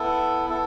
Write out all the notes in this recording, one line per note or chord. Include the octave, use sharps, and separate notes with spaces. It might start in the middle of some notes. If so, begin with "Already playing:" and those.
Already playing: B3 E4 A4
B3 E4 A4